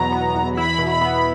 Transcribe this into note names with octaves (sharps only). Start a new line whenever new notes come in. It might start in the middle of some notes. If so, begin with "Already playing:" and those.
Already playing: E2 B2 F#3 B3 A#5
B3
E2
E4 B5
B2
B5
B3